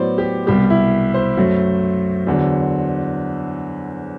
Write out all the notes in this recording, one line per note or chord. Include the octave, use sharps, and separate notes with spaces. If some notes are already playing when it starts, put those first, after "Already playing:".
Already playing: A2 F#3 B3 C5 D5
G4
C2 B2 G3 G4
E4
C5
F#2 F#3 A3
E2 D3 F#3